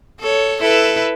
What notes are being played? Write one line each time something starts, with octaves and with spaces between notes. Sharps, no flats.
A4 C#5
E4 A4 B4